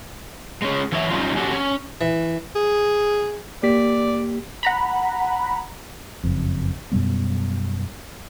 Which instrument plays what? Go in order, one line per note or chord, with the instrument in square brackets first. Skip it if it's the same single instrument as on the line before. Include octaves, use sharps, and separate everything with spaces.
[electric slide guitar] G#3 C#4
E3 F#3 E4 C#5 D5 E5
G3 C#4 D#4 F4
C#4 D4 F#4 G4 A4
C#4
[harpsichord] E3
[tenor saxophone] G#4
[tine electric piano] A#3 G4 B6 [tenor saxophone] D5
[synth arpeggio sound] F#5 A#5 B5
[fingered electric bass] F#1 F2
F#2 B2 G3 B3